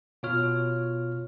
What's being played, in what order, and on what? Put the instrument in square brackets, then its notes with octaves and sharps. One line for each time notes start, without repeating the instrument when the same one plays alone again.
[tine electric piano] B2 F4 C#5 F6